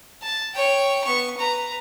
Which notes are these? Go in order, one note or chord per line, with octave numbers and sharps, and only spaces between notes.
A5
C#5 G5
B3 C#6
B4 A#5